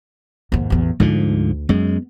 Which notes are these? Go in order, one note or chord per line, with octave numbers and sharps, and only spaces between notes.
D#2 G#2
A1 E2
D2 G#2 D3 F3
F#2 G#3 B3